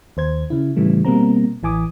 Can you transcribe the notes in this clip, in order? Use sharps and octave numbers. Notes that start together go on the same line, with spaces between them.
D#2 C5 G#6
C#3 E4
A2 C#3 E3 G3 A3
B2 G3 A#3 C4 A#5
A1 E3 G#5 D6 D#6